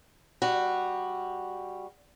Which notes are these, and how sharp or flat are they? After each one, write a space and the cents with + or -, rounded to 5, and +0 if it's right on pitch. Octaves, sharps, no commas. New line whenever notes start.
G3 +10 F#4 +0